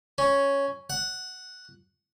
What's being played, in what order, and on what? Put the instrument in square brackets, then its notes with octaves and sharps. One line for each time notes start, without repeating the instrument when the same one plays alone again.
[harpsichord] C#4
F#5